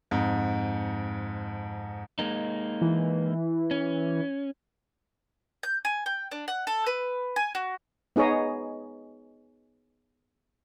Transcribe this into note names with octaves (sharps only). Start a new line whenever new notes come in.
F2 G#2
G#3 A#3 D#4
E3
C#4
G6
G#5
G5
D4
F#5
A4
B4
G#5
F#4
B3 D#4 G#4 C#5 D#5